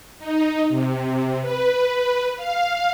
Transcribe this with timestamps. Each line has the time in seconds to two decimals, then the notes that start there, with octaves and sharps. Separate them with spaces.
0.19 D#4
0.69 C3
1.41 B4
2.36 F5